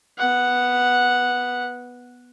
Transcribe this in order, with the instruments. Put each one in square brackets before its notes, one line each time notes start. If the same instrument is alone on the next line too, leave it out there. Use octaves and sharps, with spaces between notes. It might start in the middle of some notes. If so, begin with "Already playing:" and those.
[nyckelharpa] B3 F#5